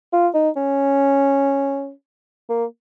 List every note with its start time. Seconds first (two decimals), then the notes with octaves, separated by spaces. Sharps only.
0.13 F4
0.34 D#4
0.56 C#4
2.49 A#3